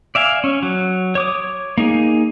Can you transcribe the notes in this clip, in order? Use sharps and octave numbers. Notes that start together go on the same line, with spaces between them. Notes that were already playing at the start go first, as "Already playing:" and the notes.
D5 E5 F5 G#5
C#4
F#3
C#5 D6 D#6
A#3 D#4 G#4